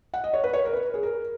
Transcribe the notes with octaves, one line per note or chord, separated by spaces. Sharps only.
F#5
D#5
C#5
B4
C#5
A#4
B4
G#4
A#4